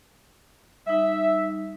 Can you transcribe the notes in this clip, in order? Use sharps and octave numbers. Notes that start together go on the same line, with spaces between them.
G3 D#4 E5